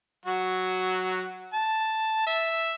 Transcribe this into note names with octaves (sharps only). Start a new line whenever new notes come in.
F#3 F#4
A5
E5